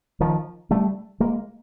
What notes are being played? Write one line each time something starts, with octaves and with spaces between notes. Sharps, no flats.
D#3 F3
G3 A3
G#3 A#3